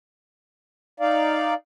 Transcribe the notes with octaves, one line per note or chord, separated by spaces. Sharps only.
D#4 D5 F5